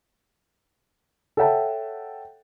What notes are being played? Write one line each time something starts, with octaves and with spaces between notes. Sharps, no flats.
A4 C#5 E5 F#5 G5 A5